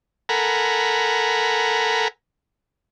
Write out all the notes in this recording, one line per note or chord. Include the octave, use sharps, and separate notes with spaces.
A4 A#4 F#5 G#5 A#5 B5